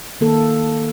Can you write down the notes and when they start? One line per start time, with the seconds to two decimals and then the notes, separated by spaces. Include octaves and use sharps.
0.21 D#3 A#3 A4